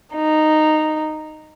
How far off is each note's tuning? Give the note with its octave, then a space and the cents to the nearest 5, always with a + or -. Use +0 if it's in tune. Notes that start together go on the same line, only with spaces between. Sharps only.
D#4 -10